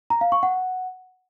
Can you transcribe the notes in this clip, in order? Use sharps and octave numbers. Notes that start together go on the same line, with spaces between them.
A#5
F5
C#6
F#5